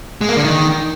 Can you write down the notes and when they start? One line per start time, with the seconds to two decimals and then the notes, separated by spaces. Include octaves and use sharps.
0.21 G#3
0.29 A#3
0.37 D3
0.44 D#3